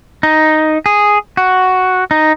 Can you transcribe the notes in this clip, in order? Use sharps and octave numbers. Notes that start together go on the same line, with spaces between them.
D#4
G#4
F#4
D#4